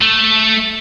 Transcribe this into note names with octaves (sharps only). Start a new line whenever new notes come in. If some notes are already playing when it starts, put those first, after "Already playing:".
A3